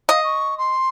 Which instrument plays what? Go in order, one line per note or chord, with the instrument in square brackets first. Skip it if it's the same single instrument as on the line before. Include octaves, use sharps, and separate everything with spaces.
[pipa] D#5 [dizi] F5
[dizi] C#6
C6